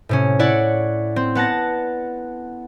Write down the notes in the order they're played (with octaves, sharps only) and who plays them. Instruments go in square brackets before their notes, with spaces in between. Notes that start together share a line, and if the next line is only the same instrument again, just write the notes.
[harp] A2 C3 C#4
E4 C#5 D5 F#5
C4
B3 F#5 A5 A#6